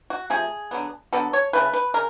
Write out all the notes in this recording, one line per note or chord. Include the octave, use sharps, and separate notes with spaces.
F#4
C3 F3 A3 G#4
D3 F#3 B3
D3 F#3 B3 A4
C#5
C#3 F3 A3 B4
B4
C#3 A#4